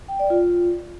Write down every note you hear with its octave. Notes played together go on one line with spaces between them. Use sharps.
G5
D5
F4